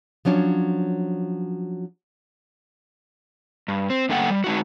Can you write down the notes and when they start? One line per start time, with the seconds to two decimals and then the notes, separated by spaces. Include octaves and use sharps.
0.25 F3 F#3 C#4 D4
3.68 G2
3.90 C4
4.09 G2 D3 A3 A#3 F#5 G5
4.30 G3
4.44 G#3 D#4 F#4